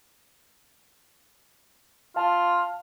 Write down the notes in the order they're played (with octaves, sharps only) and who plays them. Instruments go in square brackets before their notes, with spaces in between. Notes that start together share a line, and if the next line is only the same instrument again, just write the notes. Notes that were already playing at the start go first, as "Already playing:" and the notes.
[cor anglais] F4 [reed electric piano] F5 A5